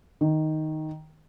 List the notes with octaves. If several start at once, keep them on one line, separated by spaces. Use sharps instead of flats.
D#3